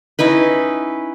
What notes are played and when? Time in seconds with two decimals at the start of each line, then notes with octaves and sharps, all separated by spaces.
0.19 C#4 D#4 E4 B4